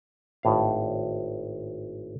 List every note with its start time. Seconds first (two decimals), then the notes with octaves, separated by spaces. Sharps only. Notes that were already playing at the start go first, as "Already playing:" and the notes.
0.43 G#1 A2 F5